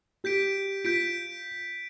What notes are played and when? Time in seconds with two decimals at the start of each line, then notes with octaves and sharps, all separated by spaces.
0.24 G4 G6 B6 D7
0.84 F4 G6 B6 D7